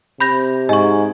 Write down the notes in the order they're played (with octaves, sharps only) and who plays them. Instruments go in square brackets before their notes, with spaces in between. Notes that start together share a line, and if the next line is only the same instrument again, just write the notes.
[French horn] C3 [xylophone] B5 G6 A#6
[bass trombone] G#2 [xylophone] D#5 C#6 [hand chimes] G#5